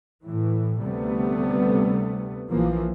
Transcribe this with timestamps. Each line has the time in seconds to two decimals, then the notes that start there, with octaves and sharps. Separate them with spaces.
0.25 A2 E3
0.83 D2 C3 G3 A3 B3
2.49 A#1 E3 F3 A#3